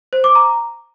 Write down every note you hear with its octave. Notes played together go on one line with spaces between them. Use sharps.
C5
D6
A#5